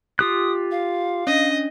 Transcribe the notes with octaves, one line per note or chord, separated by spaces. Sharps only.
F4 G4 D#6 F#6
F5
C#4 D4 D#5